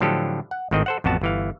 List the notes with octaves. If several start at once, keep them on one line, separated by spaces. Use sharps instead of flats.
A2 D3 F3 F#3 G4 A4
F#5
G#1 A2 D#3 C4 D#5
A4 C5 F#5
A1 F2 B3 F#4 A5
G1 E3 F5